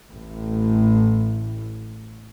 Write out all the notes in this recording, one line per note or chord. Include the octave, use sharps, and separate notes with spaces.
A1 A2